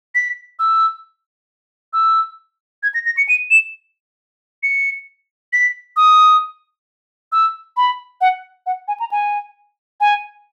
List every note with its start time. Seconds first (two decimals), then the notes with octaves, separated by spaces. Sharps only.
0.15 B6
0.59 E6
1.93 E6
2.83 G#6
2.94 A#6
3.06 A#6
3.17 C#7
3.29 D#7
3.50 E7
4.63 C#7
5.53 B6
5.97 D#6
7.32 E6
7.77 B5
8.21 F#5
8.66 F#5
8.88 G#5
9.00 A#5
9.12 G#5
10.01 G#5